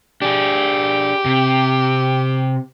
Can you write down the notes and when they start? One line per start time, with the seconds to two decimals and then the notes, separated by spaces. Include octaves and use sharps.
0.22 D4 G4 G#4
1.25 C3